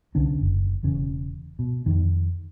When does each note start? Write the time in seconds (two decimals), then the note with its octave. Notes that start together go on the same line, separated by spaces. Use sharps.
0.15 C2 D3 C#4 D4
0.41 F#1
0.83 E1 E2 C#3
1.59 B2
1.86 F2 D#3